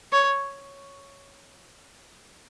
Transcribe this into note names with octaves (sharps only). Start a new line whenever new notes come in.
C#5